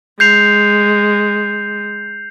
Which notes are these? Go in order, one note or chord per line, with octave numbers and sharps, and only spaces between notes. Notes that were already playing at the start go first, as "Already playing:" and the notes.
G#3 G6 C7 F7